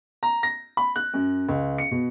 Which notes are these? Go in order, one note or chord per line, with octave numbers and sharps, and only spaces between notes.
A#5
A#6
B5
F#6
F#2
C#2
C#7
B2